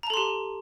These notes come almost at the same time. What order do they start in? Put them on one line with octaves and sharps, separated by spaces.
A#5 A5 A4 C6 G4